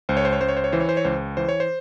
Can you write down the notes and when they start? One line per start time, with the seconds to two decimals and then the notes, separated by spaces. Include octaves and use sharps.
0.09 C#2 C5
0.17 C#5
0.25 C5
0.33 C#5
0.41 C#2 C5
0.48 C#5
0.57 C5
0.64 C#5
0.72 E3 C5
0.80 C#5
0.89 C5
0.97 C#5
1.05 C#2 C5
1.37 E3 C5
1.49 C#5
1.60 C5